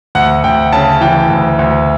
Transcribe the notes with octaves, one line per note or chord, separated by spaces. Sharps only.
D2 F#5
D2 G5
C#3 A5
E3 G5
D2
D2